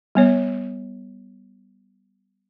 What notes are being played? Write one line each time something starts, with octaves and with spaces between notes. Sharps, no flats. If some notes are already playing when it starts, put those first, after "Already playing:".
G3 B3 C#5